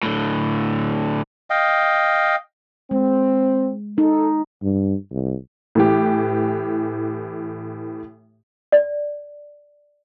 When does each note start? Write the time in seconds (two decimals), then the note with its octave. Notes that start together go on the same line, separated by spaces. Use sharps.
0.03 A2 D3
1.50 D#5 F5 G5
2.91 G#3 C4
3.98 D#4 A4
4.63 G2
5.12 C2
5.75 A2 E3 G4
8.72 D5